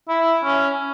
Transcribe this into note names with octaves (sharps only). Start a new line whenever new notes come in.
E4
C#4